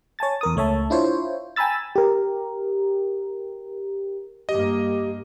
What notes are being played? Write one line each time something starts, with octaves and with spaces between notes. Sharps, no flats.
C#5 G#5 A5 A6
E2 A#4 D#6
C#2 A3 C#5 E5 A5
D4 E4 F4 C5 C#5
G5 G#5 A#5 B5 E6 A6
G4 A#4
G2 A#3 G4 D#5